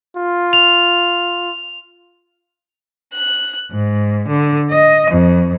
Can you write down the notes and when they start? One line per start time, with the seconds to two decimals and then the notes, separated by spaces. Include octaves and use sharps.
0.16 F4
0.53 F7
3.14 F#6
3.69 G#2
4.28 D3
4.68 D#5
5.10 F2